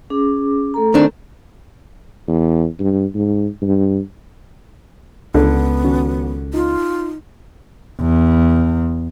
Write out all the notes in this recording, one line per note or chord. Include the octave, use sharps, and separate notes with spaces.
C#4 G#4 D6
A3 A4 A#5
D#3 C4 D4
E2
G2
G#2
G2
C#2 D3 B3
D#3 C#4 F#4
D#4 F4
E2